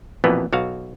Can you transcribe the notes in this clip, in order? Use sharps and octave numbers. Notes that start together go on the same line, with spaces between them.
A#1 F2 B2 E3 B3
B1 F#4 F5